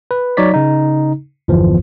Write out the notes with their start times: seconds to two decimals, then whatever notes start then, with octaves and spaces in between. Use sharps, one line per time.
0.11 B4
0.37 F#3 D#4 C#5 D5 B6
0.54 C#3 D#4
1.48 G1 E2 E3 F3